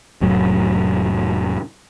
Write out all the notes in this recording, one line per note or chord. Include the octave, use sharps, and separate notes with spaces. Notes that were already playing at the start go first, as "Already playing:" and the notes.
F1 A2 F#3